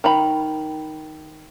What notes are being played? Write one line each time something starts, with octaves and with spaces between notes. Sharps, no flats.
D#3 A#5 B5